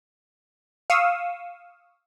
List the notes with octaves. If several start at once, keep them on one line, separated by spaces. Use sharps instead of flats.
F5 C#6 D#6 E6